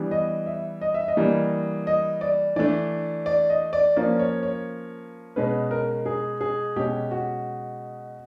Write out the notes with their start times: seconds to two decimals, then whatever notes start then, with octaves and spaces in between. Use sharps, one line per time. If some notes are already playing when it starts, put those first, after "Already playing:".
Already playing: E3 G3 B3 D4
0.11 D#5
0.46 E5
0.81 D#5
0.94 E5
1.08 D#5
1.17 E3 G3 A#3 D4
1.87 D#5
2.21 D5
2.56 E3 A3 D4 D5
3.26 D5
3.50 D#5
3.73 D5
3.96 F3 A#3 C#4 D5
4.19 C#5
4.43 C#5
5.36 B2 G#3 C#4 B4
5.71 A#4
6.06 G#4
6.41 G#4
6.76 B2 G#3 C#4 G4
7.11 F#4